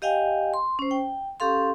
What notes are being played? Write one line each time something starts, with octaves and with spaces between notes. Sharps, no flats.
G4 D#5 F5 G5 G#5
C6
C#4 C5
G5
C#4 G4 A4 F5 C6